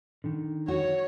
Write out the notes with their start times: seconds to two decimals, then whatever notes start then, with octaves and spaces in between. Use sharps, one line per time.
0.24 D3 D#3
0.68 F#4 C#5